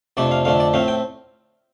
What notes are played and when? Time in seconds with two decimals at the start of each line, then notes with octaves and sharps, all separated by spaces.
0.17 F2 C3 A3 D4 D5
0.31 F5
0.45 F2 D3 A3 D4 F5
0.60 D5
0.73 A2 A3 C4 F5
0.88 G5